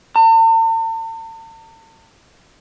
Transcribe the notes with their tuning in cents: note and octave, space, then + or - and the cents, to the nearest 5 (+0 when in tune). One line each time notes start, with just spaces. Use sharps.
A5 +45